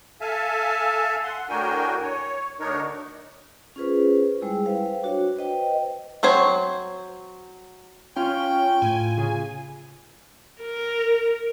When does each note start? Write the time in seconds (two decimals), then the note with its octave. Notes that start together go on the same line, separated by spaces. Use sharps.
0.21 A4 E5 F5 G#5 A5
1.23 F#5 C6
1.49 A2 D4 F#4 A#4 G5 G#5
2.02 C#5
2.60 D2 D4 D#4 A#4 C#5
3.76 C#4 F4 G#4 B4 C5
4.41 G3 G#3 E4 G#4
4.66 B4 C5 F5 G5
5.03 D4 F#4 C#5
5.36 B4 C5 D#5 G5
6.23 F#3 C4 C5 C#5
8.17 C#4 F4 G5 F6
8.82 A2 G#5
9.17 C#3 G#4
10.61 A#4